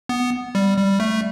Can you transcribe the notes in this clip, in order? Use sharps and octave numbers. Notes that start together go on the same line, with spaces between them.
B3
G3
G3
A3